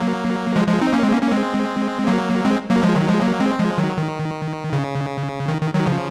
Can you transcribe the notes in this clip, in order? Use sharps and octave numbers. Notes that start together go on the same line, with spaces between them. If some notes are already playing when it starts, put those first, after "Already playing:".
Already playing: F#3 A#3
F3 G#3
F3 G#3
C4 D#4
A#3 C#4
G#3 C4
A#3 C#4
A#3 C#4
G#3 C4
F#3 A#3
G#3 C4
F#3 A#3
F3 G#3
D#3 F#3
F3 G#3
F#3 A#3
G#3 C4
F3 G#3
D#3 F#3
D#3
C#3
D#3
D#3
D#3 F#3
C#3 F3